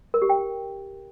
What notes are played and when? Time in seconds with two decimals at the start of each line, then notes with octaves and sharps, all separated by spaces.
0.14 A#4
0.22 G4
0.29 G5